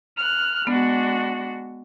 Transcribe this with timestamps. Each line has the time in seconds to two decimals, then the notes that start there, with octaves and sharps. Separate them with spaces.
0.17 F6 F#6
0.67 G#3 B3 D4 F#4